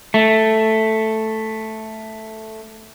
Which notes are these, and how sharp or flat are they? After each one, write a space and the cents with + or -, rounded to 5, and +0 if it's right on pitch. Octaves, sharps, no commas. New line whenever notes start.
A3 +0